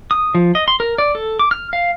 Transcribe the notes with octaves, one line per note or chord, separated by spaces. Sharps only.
D#6
F3
D#5
C6
A#4
D5
A4
D6
F6
F5